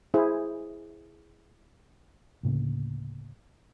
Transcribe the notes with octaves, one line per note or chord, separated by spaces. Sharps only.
E4 G#4 C5
D2 A2 C#3 A#3